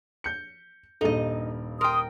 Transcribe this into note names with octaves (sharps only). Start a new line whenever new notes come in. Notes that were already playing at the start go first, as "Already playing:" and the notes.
G6 C#7
D#1 G2 D#4 A4 D#5
A#4 G5 C6 D#6